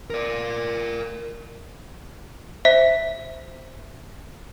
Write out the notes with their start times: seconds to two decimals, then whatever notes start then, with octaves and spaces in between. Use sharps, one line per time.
0.10 A#4 D5
2.65 C5 E5 B6